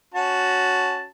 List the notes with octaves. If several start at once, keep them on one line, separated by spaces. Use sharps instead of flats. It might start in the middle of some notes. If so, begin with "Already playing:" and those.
C#4 F#4 A5